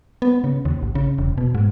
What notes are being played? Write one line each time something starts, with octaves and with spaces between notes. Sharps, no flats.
B3
C#3
D#2
A1
C#3
E1
B2
G#2